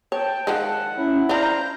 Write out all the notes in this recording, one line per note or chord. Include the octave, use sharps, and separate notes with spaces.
C#5 G5 A5
D#3 F3 G#3 F#5
C#4 E4
D4 F4 C5 F5 A#5 G6